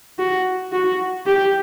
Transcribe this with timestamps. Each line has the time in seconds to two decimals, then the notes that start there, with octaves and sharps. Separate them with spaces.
0.19 F#4
0.72 F#4
1.26 G4